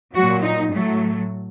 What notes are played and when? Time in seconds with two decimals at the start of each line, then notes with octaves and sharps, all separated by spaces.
0.14 A#2 F#3 F#4
0.43 D#4
0.73 A2 F#3 A3